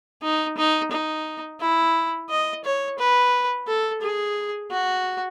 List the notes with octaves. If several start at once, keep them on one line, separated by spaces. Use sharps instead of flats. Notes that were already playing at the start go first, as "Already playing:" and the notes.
D#4
D#4
D#4
E4
D#5
C#5
B4
A4
G#4
F#4